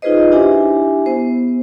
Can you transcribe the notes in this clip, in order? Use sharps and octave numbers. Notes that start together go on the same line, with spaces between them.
D#4 F4 G#4 B4 C5 D#5
D4 E4 G4 E5 G#5
B3 C5